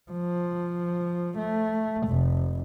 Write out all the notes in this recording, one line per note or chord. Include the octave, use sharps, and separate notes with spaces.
F3
A3
F1